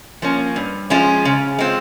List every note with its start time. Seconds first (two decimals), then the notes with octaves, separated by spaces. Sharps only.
0.22 F3 A#3 C#4
0.56 G2
0.90 F3 G#3 C#4 F4
1.25 C#3
1.59 G#3 C4 F4